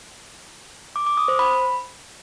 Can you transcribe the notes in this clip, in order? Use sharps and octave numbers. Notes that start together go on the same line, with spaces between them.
D6
D6
D#6
C5
B5